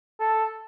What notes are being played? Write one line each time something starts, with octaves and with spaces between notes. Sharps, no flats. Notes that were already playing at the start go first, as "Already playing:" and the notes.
A4